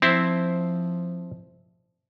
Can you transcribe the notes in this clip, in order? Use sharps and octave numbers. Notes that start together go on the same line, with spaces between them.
F3 C4 E4 C5